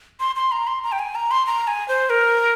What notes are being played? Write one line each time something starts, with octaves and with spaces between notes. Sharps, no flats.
C6
C6
A#5
C6
A#5
G5
G#5
A#5
C6
A#5
G#5
C5
A#4